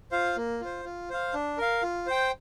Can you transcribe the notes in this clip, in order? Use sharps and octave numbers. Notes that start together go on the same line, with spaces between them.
F4 C5 F5
A#3
F4 C5
F4
C5 F5
D4
A#4 F5
F4
C5 G5